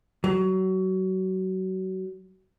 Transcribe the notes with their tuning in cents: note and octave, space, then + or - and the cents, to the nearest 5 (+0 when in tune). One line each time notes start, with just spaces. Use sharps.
F#3 +25